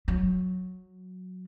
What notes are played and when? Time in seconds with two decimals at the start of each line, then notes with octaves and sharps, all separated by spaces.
0.08 F#3